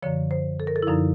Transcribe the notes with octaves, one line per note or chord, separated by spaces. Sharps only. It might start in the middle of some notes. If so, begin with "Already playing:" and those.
F#2 D3 F3 C#5
C5
A4
A#4
A4
E4
F#2 D3 F3 D#4